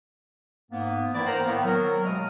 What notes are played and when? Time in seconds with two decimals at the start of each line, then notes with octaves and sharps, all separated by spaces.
0.70 G#2 A#3 B3
1.13 G2 D#3 E3 A#3 E4 D5
1.25 A#4 C5 F#5 G5 A#5
1.45 A2 D#3 A#3 B3
1.64 F#3 A#4
2.04 D#2 B2 G#3 A3 D#5 F6